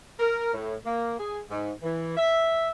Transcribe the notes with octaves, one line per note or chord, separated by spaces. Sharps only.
A#4
A2
A#3
G#4
G#2
E3
E5